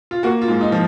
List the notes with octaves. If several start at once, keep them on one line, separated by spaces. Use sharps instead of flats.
F4
A#3 F#4
F4
G#2
D#4
F3